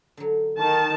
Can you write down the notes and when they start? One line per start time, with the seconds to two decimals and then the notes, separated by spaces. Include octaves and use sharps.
0.17 D3 F#3
0.58 D#3 A5